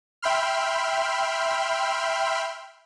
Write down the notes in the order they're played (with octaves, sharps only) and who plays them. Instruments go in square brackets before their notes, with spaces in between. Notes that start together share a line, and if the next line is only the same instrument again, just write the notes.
[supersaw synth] E5 G5 B5 C6 F6